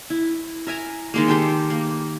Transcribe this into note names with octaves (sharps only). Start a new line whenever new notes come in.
E4
A#4 E5 G#5 A#5
D#3 G#3 A#3
G4 A4 C5 G5
A#3